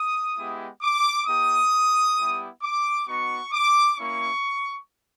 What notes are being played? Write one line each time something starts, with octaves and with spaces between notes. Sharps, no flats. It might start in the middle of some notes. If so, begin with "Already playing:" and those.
Already playing: D#6
G#3 B3 E4 G4
D6
A#3 D#4 G4 D#6
G3 B3 E4 G4
D6
B3 D#4 F#4 C#6
D6
A#3 C#4 E4 C#6